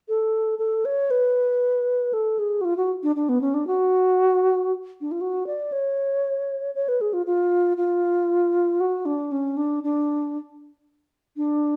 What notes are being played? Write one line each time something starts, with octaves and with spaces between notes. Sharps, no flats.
A4
A4
C#5
B4
A4
G#4
F#4
F4
F#4
D4
D4
B3
C#4
D4
F#4
D4
F4
F#4
D5
C#5
C#5
B4
G#4
F4
F4
F4
F#4
D4
C#4
D4
D4
D4